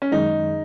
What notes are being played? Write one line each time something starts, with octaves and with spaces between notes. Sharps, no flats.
C#4
F#2 D#3 G#3 D#4